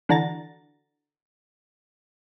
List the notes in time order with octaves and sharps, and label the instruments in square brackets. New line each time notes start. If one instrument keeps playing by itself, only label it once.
[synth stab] D3 E3 D4 F#4 A#5 A6